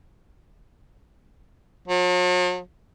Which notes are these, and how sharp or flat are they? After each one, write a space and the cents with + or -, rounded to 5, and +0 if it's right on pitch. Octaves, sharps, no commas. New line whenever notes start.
F#3 -45